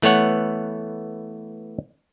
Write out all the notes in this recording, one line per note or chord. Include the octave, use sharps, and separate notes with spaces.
E3 A3 B3 C#5 F#5